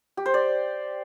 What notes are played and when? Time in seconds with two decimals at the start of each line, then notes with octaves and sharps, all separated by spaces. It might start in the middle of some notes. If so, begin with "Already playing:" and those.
0.17 G4
0.26 C5
0.34 D5